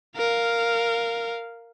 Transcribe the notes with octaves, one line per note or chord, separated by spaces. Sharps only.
A#4 F5